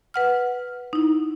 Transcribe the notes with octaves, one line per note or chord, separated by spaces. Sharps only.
B4 F#5 F6
D#4 E4